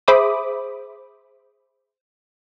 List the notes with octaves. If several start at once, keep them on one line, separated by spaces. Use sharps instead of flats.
G#4 C5 E5 B5 D6 D#6